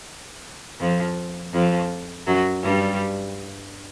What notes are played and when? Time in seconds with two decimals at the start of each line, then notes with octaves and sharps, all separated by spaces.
0.80 F2 F3
1.53 F2 F3
2.27 F#2 F#3
2.63 G2 G3